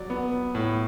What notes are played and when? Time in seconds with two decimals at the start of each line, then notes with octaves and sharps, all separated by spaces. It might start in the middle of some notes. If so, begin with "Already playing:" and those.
Already playing: F#3 D5
0.10 B3
0.55 A2